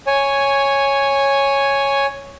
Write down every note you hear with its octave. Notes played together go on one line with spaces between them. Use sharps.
C#5 G#5